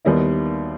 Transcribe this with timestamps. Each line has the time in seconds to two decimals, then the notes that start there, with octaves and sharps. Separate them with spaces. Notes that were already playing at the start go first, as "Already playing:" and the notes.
0.05 D#2 D#3 G3 B3 E4